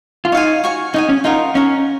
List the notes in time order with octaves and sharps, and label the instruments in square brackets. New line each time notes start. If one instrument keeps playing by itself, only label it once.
[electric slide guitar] F4
[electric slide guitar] D#4 [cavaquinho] C#5 F5 G#5
[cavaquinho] F#4 C#5 G#5 C#6
[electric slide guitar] D#4 [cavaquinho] G#4 C#5 G#5
[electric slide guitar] C#4
[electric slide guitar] D#4 [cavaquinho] F4 A#4 D#5 F#5
[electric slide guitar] C#4 [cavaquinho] D#4 F#4 A#4 F5